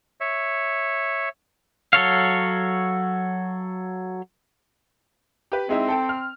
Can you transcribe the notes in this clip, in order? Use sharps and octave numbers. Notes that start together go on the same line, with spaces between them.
C#5 E5
F#3 A4 C#5 F5
G4 B4
G#3 C4 D#4 E4
A4 G5 A5
F6